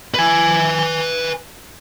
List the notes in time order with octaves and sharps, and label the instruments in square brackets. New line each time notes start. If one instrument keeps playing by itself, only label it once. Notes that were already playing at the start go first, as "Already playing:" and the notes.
[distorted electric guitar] B4 G#5